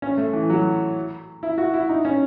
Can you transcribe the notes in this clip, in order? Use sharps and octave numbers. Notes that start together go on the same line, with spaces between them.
C#4
A3
E3
F#3
E4
F#4
E4
D#4
C#4